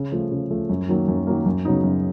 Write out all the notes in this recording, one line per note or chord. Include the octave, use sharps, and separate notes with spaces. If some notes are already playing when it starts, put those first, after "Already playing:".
Already playing: C#3
F3 A3
C#3
F3 A3
F#2
D#3 F#3 A#3
F#2
D#3 F#3 A#3
F#2
C#3 F#3 B3 D#4
F#2